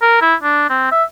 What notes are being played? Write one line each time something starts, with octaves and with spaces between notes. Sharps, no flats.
A#4
E4
D4
C4
E5